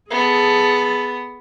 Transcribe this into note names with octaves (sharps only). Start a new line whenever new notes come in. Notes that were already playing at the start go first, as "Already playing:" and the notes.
B3 G#4 A4